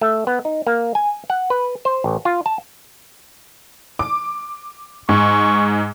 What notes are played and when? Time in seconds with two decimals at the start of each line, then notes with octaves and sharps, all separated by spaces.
0.01 A3
0.27 B3
0.45 D#4
0.67 A#3
0.95 G#5
1.30 F#5
1.50 B4
1.85 C5
2.04 A1
2.25 F4
2.46 A5
3.99 D6
5.09 G#2 C#6